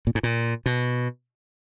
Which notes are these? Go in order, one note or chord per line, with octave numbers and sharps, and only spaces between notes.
A#2
G#2
A#2
B2